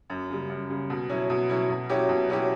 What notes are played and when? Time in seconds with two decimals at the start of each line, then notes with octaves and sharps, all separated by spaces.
0.10 F#2
0.30 C#3 G3
0.49 F#2
0.70 C#3 G3
0.90 B2
1.09 F#3 C#4 E4
1.30 B2
1.49 F#3 C#4 E4
1.69 B2
1.89 F#3 C#4 E4 G4
2.09 B2
2.29 F#3 C#4 E4 G4